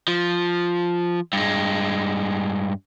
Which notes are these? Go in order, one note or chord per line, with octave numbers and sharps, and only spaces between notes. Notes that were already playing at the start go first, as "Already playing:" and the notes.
F3
G2 G#3